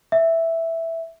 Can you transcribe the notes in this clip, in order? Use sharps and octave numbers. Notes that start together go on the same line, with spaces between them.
E5